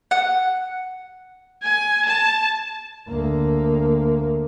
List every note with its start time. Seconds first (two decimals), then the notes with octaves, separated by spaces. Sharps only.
0.11 F#5
1.63 G#5
2.06 A5
3.09 D2 A#3